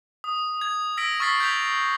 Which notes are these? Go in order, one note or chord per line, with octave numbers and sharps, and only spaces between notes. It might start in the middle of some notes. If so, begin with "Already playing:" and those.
D#6
G#6
E6 A#6 B6 D7
C#6 E6 F6 A6 B6 C7
G6 G#6 B6 F7